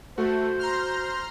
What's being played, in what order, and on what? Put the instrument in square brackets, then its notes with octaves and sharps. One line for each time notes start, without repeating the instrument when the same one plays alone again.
[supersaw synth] A3 [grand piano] F#4 [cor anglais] C5
[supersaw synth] A#5 C6 F6